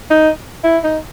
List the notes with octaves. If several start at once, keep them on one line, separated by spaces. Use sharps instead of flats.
D#4
E4
D#4